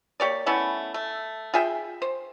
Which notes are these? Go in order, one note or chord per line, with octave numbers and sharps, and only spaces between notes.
A#3 G4 C#5 D5
A3 B3 C#4 E4
A3
F4 G#4 E5 G5
C5